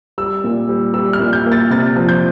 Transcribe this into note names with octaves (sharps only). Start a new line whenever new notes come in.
G3 E6
A#2
G3
G3 E6
F6
A#2
G6
A#3
A6
C3 A6
F3
G6